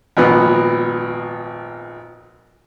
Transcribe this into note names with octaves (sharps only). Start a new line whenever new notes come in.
G#1 F2 A#2 B3 B4